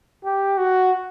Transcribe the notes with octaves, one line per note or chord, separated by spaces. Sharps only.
G4
F#4